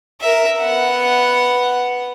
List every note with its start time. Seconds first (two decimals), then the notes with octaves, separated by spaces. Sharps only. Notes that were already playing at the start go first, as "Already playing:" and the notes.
0.21 A#4 E5
0.60 B3 F#5